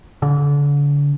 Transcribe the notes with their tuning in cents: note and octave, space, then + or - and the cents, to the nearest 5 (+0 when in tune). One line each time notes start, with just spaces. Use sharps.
D3 -35